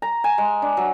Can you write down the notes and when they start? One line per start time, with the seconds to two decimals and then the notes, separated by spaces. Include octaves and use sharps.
0.02 A#5
0.24 G#5
0.38 G#3
0.62 D4
0.77 F#3